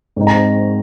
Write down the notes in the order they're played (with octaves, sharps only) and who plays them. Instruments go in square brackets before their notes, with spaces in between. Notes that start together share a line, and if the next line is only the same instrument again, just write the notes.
[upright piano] G#2 G#3 C4 D#4
A#5